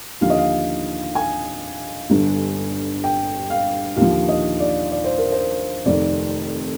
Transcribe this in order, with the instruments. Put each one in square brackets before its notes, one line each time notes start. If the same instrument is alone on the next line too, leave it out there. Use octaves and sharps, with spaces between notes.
[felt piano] D#2 D3 F3 F5
D#5
F5
G#5
G1 G2 D3
G5
F5
D#2 D3 F3 F5
D#5
D5
D5
C5
A#4
C5
F1 F2 D#3 D5